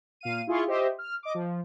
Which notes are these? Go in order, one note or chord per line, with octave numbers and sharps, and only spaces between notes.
A#2 F5 D#7
E4 F4 G#4 C6 C#6
G4 C5 D#5 E5
F6
D#5 D6
F3